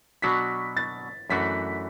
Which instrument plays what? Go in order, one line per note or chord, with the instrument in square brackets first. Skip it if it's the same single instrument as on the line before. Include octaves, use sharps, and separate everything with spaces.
[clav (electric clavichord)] B2 F#3 D4 F#4 [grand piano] B6
[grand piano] A6
[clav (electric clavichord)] F#2 E3 A3 D4 F#4 [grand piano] B6